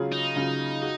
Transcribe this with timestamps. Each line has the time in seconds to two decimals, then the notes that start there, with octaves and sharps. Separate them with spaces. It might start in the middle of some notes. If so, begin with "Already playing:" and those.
Already playing: C#3 F#3 C#4 F4 G#4
0.12 D#4
0.36 C#3 F#3 C#4 F4 G#4
0.82 F#4